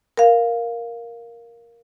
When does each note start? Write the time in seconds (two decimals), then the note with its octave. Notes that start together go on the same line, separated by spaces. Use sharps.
0.17 A#4 F5